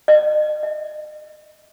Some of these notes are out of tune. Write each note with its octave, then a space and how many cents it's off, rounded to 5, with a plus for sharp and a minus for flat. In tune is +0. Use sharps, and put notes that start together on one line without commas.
D#5 -40
D#5 +45